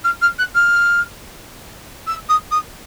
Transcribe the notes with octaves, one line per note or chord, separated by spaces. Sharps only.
F6
F6
F#6
F6
E6
D#6
D#6